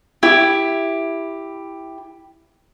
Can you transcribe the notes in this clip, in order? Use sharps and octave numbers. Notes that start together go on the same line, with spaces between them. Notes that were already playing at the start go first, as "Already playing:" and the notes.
E4 G4